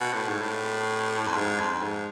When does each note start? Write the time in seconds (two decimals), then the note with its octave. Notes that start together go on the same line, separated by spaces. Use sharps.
0.01 B2
0.14 A2
0.28 G#2
0.42 A2
1.27 F2
1.36 G#2
1.60 F2
1.83 G#2